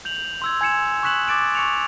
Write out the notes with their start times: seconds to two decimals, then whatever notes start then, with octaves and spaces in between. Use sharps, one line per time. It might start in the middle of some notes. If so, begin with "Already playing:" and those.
0.05 G6 F7 F#7
0.42 C6 E6 G#6
0.61 G#5 G#6 C#7 E7
1.03 C#6 D#6 F#6 B6 E7 F#7
1.28 D6 A6 D7 E7
1.55 C#6 C#7 F7